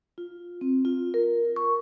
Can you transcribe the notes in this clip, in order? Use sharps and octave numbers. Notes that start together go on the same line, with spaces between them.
F4
C4
F4
A#4
C#6